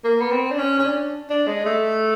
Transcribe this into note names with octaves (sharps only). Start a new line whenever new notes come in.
A#3
B3
C4
D4
C#4
C#4
D4
D4
G#3
A3